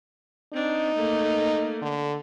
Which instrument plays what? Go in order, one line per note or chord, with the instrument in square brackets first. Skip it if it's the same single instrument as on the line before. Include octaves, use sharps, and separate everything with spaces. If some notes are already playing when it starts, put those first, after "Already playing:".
[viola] C4 D4 [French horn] D#4
[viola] A3 A#3
[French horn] D3